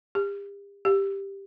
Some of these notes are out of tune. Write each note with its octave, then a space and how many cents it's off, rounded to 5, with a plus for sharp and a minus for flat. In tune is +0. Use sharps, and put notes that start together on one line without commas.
G4 +40
G4 +5